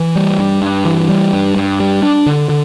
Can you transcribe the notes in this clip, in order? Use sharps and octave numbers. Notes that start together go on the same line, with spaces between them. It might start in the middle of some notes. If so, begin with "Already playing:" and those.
Already playing: E3
G3
G2
G2
E3
G3
G2
G2
G3
D4
D3
D3